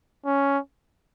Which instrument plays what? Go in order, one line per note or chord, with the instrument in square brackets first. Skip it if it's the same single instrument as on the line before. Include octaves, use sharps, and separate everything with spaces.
[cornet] C#4